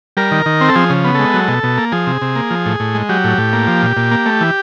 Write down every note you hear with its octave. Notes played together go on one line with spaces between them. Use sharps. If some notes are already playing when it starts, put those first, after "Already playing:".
G3 A#4
D#3
D#3
C4
A4
F3 G#4
C#3
B3
G#3 A4
F#3
B2
B2
A#3
F3 G#4
C3
C3
A#3
F3
A2
A2
G#3
F#3 G4
A2
A2
A#3
F3
A#2
A#2
A#3
A3
E3